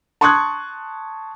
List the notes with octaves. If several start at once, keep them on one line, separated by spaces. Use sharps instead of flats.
A5 C6 C#6 D#6 F#6 G#6